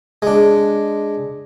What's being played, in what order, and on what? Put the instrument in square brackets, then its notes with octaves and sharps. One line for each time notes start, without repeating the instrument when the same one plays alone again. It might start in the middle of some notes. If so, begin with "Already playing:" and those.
[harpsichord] G#3 D4